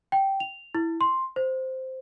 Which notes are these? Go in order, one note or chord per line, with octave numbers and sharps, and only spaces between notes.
G5
F7
E4
C6
C5